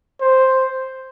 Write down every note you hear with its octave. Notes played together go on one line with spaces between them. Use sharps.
C5